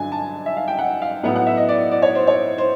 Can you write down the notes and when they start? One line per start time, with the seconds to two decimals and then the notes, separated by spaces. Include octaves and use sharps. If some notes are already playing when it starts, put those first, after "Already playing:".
Already playing: G2 D3 F#3 G#5
0.12 A5
0.46 E5
0.57 F5
0.68 G5
0.79 F#5
1.02 F5
1.23 A2 F#3 B3 E4 F#5
1.36 F#5
1.47 E5
1.57 D#5
1.69 D5
1.91 D5
2.02 C#5
2.15 C5
2.27 C#5
2.58 C5